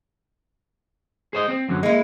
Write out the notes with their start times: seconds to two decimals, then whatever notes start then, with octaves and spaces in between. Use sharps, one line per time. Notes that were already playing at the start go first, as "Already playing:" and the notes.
1.33 G#4 C5 D#5
1.48 C4
1.69 F#2 D3 F#3
1.83 G#3 A#3 E4